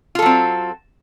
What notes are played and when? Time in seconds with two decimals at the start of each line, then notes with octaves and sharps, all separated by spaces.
0.15 F4
0.19 A4
0.22 F#3
0.26 C4